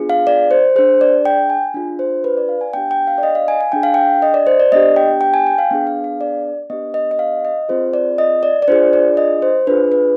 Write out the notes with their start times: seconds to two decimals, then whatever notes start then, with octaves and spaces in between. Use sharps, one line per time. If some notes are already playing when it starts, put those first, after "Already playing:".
Already playing: B3 D4 F4 G#4
0.10 F5
0.27 D5
0.51 C5
0.76 D4 G#4 C5
1.01 D5
1.25 G5
1.50 G#5
1.74 D4 F4 G#4
1.99 C5
2.24 B4
2.37 D5
2.49 F5
2.61 G#5
2.73 B3 D4 G4 G5
2.91 G5
3.07 F5
3.18 D5
3.23 D#5
3.35 F5
3.48 G#5
3.61 G#5
3.72 D4 G#4 G5
3.83 F5
3.94 G5
4.22 D#5
4.34 D5
4.47 C5
4.60 D5
4.72 B3 D4 G4 D#5
4.96 G5
5.21 G5
5.34 G#5
5.47 G5
5.58 F5
5.71 B3 D4 G#4
5.87 F5
6.04 F5
6.21 D5
6.70 B3 D4 G4 D#5
6.94 D#5
7.11 D#5
7.19 F5
7.45 D#5
7.68 C4 F4 G#4 C5
7.94 D5
8.18 D#5
8.43 D5
8.62 D5
8.68 D4 F4 G#4 C5
8.93 D5
9.17 D#5
9.42 C5
9.67 D4 F4 G#4 B4
9.92 B4